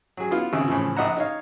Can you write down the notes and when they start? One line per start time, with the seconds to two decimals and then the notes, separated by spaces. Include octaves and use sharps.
0.17 F#3 G#4
0.31 B3 E4 F4 F5
0.53 G#1 C#3 E6
0.68 A2 C#3 E3 F3
0.96 A#1 D#5 E5 F#5 A#5
1.17 D#4 C#5 F5